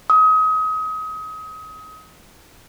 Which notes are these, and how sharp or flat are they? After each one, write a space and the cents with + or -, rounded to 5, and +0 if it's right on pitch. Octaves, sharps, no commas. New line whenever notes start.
D#6 +30